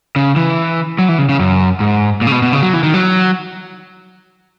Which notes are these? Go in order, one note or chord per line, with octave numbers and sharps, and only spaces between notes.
C#3
E3
F#3
E3
C#3
C#3
F#2
G#2
A#2
C#3
B2
B2
C#3
F#3
E3
D#3
F#3